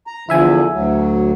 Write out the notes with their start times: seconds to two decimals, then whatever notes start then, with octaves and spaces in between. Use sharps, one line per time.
0.07 A#5
0.29 E2 D3 F3 E4 E5 G#5
0.73 D2 F#3